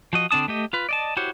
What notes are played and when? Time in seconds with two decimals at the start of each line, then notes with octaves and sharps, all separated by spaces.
0.13 F3 F#4 D#5
0.31 D3 C4 D4 A5 D#6
0.48 A3 G4 D#5
0.73 F4 B4
0.89 D5 D#5 A5
1.17 E4 F#4 G4 C5 C#5